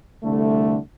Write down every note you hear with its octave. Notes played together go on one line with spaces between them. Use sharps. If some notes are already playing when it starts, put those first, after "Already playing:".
C2 D3 A3